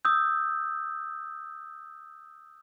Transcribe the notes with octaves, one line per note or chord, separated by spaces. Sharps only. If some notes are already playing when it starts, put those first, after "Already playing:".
D#6 E6 G6